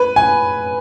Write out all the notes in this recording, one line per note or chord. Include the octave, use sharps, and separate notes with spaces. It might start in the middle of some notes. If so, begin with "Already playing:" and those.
Already playing: B4
G#5